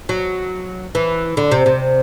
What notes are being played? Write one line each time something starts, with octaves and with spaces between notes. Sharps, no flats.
F#3
E3
D3
C3
C3